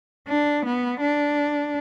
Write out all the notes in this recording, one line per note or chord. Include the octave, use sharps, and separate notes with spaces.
D4
B3
D4